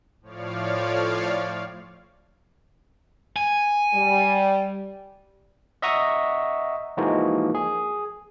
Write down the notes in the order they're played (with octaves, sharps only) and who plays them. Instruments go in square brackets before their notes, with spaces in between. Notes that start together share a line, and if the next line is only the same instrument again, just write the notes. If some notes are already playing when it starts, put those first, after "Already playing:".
[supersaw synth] A2 F3 C#5 D5 F5
[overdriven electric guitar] G#5
[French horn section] G3
[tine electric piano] D#5 E5 F#5 A#5 C#6 D#6
E3 F3 G#3 A#3 D#4 F#4
G#4